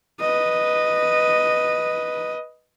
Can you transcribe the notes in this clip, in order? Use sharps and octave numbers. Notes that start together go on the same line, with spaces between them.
B4 D#5